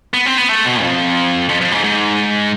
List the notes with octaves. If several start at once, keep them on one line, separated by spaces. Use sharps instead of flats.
B3
C4
B3
A3
B2
F2
F2
F2
G#2
G#2